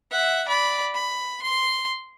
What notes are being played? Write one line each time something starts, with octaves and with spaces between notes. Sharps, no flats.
E5 F#5
D5 B5
B5
C6